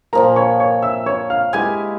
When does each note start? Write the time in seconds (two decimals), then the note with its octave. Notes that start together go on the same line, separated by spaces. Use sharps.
0.13 A#2 F3 A#3 A#4 A#5
0.36 C#5 C#6
0.60 C#5 C#6
0.82 E5 E6
1.06 C#5 C#6
1.30 F5 F6
1.53 G#3 E4 G4 G#5 G#6